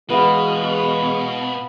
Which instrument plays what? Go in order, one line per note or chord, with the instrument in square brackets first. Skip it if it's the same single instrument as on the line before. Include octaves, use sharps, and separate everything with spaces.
[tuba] E2 [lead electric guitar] B2 [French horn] G#3 [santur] B3 F5